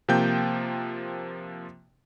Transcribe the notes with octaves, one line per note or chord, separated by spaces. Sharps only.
C3 F3 A#3 G5 G6